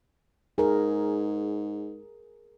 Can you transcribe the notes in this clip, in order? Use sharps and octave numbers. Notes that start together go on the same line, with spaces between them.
G#2 G#4 A#4